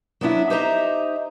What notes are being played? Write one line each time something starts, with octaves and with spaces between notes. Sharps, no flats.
F#3 B3 D4 E4
D#4 G4 C5 D#5 E5 A#5